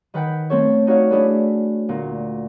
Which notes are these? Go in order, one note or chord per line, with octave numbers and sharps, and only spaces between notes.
D#3 B4 F#5 G5 G6
A3 C4 A4 C#5
D#4 F#4 C#5 D5 F5
A3 D4 E4 G#4 A4 B4
D2 A#2